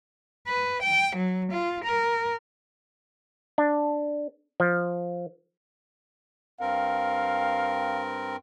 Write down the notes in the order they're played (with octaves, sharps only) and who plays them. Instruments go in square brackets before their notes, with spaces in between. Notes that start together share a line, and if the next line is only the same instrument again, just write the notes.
[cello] B4
G5
F#3
F4
A#4
[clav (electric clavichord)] D4
F3
[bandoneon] G2 C4 A#4 [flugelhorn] F5